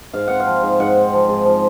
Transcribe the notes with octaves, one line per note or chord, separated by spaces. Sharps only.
G#2 F5
C4 F#5
F5
F3
G#2
G#2 F#5
C4
F3
G#2
F3